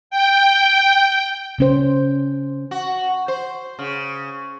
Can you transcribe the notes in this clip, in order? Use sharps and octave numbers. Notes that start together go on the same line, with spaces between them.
G5
C#3 C#4 C5
F#4
C5
C#3